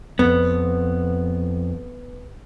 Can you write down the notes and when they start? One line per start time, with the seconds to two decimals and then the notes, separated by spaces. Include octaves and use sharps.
0.19 F2 B3